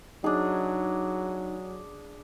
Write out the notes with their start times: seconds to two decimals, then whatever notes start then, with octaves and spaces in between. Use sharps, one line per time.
0.24 F#3 D4 D#4 G#4